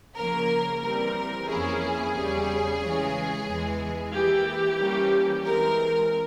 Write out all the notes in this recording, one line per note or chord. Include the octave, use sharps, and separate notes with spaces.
C#3 F3 A#3 A#4
E3 G3 C4 A#4
F2 E3 A#3 C#4 E4 G#4
E2 C#3 G3 C#4
C#3 E3 G#3 C#4
E2 E3 G#3
E3 A#3 E4 G4
E3 G3 A#3 C#4
E3 G#3 C4 A#4